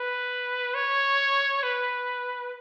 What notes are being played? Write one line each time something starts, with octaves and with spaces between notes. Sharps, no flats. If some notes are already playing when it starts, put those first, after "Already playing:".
Already playing: B4
C#5
B4